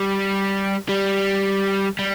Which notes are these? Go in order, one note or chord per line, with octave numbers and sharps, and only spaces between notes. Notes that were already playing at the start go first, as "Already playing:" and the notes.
Already playing: G3
G3
G3